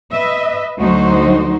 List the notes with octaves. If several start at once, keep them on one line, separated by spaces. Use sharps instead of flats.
B4 D#5 E5
D2 F#3 D#4 F#4 C5